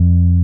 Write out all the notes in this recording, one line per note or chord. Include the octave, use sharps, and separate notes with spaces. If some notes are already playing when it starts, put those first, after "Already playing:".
Already playing: F2